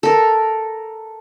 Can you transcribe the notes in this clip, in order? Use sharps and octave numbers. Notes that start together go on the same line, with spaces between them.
A4 A#4